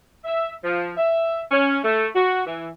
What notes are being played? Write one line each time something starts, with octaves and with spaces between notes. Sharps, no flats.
E5
F3
E5
C#4
A3
F#4
E3